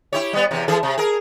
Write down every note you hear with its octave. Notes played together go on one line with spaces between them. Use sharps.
E4 G4 C#5
G3 B3
E2 C3
E3 G#4 A4
C3
G#4 A#4